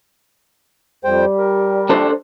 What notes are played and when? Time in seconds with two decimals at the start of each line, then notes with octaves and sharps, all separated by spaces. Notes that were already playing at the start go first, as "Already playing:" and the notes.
1.04 F2 G3 C5 G5
1.38 A#4
1.89 D4 A4 C5